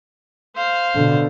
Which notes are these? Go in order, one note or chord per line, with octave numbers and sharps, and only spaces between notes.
C5 F5
B2 D3